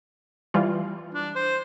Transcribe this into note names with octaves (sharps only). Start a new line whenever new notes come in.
E3 G3 F4
D4
C5